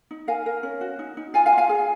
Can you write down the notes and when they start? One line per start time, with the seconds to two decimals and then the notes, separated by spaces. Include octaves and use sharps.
0.11 D#4
0.28 A#4 F5 G#5
0.46 A#4
0.63 C#4
0.81 F#4
0.99 D#4
1.17 D#4
1.34 F4 F5 G#5
1.46 F5 G#5
1.53 F4
1.58 F5 G#5
1.69 G#4